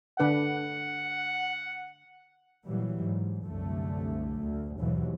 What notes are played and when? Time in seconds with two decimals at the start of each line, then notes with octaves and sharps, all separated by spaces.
0.20 D3 D4 B4 F#5
2.65 A#2 E3 F#3 G3
3.04 G#2
3.43 C2 F#2 D3 A3
4.41 D2
4.80 D#2 G#2 B2 E3 F#3